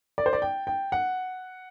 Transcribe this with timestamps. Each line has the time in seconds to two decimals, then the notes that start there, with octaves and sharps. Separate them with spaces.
0.18 D5
0.26 C5
0.33 D5
0.42 G5
0.67 G5
0.92 F#5